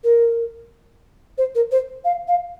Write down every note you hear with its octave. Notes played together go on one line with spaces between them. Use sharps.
A#4
C5
A#4
C5
F5
F5